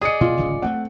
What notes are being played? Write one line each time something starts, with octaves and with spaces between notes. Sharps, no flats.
G#4 D5 D#5 D#6 C#7
B2 F4
D1 G#1 C#3
A3 A#3 C4 F#5